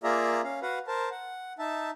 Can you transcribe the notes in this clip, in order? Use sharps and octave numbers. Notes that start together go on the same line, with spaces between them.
A#3 F4 G#4 D5 E5 A#5
C#4 F5
F#4 B4 F5 F#5
A#4 C5 A5
F#5
D#4 E5 A5